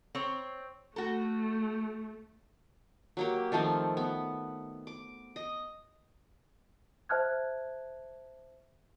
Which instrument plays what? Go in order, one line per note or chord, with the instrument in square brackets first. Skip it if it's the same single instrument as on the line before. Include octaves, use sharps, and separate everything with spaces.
[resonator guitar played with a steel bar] C4 C#5
[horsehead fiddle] A3 [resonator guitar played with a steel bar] F#4 A4
[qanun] F#3 A#3 G4
D#3 F3 A3 C4
B3
D6
D#5
[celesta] C5 E5 A5 F6 F#6 G#6